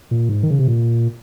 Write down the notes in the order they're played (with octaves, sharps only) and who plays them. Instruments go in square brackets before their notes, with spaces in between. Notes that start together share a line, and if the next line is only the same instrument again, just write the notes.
[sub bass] A#2
G#2
D#3
C#3
C3
A#2